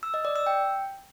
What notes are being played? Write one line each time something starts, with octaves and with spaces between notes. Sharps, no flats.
E6
D#5
D5
E6
G5